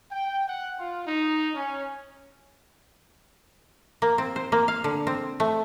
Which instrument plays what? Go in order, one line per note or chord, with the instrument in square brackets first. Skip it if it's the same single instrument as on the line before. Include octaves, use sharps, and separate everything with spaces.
[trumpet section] G5
F#5
F4
D#4
C#4
[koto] A#3
C4
C5
A#3
F5
D3
C4
A3